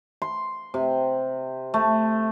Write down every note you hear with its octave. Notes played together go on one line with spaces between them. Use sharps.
C6
C3
A3